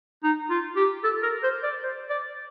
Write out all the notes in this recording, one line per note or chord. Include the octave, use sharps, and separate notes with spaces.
D#4
F4
G4
A4
A#4
C5
D5
C5
D5